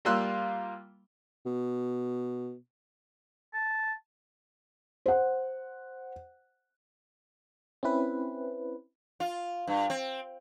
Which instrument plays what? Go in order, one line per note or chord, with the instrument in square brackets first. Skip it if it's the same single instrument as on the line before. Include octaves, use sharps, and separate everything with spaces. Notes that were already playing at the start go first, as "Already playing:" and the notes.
[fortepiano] G3 A#3 F4 C6 E6 F#6
[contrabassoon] B2
[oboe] A5
[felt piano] C5 F#5
[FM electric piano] C4 C#4 E4 B4
[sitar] F4
G2
C4